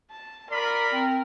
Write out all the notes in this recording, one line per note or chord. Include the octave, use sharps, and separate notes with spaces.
A5
F4 A#4 D5 B5
C4